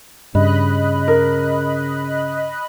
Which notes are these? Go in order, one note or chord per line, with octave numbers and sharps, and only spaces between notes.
G2 C#3 D#5 B5 F#6
A#4